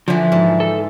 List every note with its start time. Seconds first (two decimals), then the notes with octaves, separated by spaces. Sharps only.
0.08 D3 E3 F3
0.32 G#2
0.60 A4